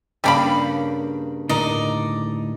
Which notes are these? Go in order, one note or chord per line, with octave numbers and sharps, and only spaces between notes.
G2 C#3 G3 A#3 D4 B5
D2 A2 D#4 A#4 D5 D#5